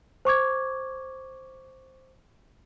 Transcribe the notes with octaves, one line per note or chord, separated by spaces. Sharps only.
C5 C#6 D6 G#6